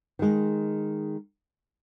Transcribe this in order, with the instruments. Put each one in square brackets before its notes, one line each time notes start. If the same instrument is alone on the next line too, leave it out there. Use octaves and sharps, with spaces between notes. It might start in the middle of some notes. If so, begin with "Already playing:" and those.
[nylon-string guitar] D#3 G#3